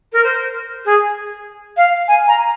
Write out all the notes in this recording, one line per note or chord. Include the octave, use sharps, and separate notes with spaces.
A#4
C5
G#4
F5
G#5
A#5